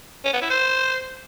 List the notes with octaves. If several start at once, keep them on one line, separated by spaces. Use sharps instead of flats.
C#4
B3
E4
C5